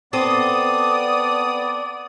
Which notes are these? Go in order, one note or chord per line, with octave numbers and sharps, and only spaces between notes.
B3 C4 A4 D5 D#6